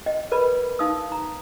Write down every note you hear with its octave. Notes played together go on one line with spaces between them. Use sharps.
D#5 G5
A#4 B4 D5 B5
D#4 F5 D#6 E6
A#5